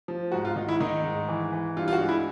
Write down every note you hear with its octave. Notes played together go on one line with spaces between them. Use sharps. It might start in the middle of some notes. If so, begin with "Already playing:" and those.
F3
G#2 F#4
F4
D#3 D#4
E4
D#3 D#4
G#2
E3
E3
G2 F4
F4
F#4
G#3
E4